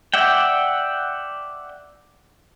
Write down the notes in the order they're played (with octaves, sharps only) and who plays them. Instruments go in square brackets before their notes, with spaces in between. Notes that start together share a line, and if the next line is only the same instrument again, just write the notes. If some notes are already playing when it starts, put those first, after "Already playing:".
[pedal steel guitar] D5 E5 F#5 G5